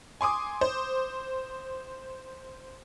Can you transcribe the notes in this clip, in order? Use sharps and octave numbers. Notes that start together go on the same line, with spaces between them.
G#5 C6 D6 D#6
C5